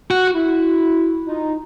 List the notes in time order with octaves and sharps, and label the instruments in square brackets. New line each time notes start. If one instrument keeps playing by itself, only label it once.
[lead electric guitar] F#4
[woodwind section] E4 F#4
D#4 F4